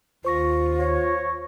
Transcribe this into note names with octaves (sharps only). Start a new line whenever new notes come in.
D#2 F4 C5 C#6 A#6
C#5